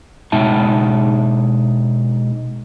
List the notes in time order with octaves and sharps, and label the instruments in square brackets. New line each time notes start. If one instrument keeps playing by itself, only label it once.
[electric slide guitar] B2 G#3 D#4 E5 A5